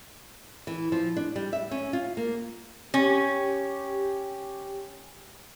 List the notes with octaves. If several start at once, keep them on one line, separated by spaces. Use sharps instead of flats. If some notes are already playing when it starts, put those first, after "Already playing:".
E3
F3
D4
G3
E5
C#4
F4
A#3
C#4 G4